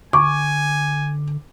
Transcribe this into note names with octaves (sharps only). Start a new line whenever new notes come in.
D3 G#5 C#6 D6